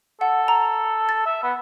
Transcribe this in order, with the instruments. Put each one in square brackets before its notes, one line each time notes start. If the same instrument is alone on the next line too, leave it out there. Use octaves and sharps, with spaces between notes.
[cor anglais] A4 [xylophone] F#5
[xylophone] A#5
A6
[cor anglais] E5
B3